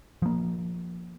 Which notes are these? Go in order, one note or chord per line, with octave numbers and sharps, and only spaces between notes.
F3 A#3